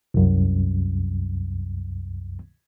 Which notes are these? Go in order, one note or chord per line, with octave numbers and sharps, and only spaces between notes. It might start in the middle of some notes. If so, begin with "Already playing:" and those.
C2 F#2